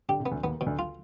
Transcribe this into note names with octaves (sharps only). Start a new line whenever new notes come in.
D3 G4
C3
B3
D2 D3
D#2 D#3 B3
B2
D2 D3
F4